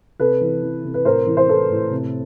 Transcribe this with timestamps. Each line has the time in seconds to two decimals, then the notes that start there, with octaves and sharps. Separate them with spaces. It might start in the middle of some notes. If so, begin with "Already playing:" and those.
0.20 C3 A4 B4
0.41 E3
0.63 E3
0.85 C3
0.94 B4
1.05 A2 A#4 C5
1.27 E3
1.37 C5
1.48 E3 A4 B4
1.71 A2
1.91 C3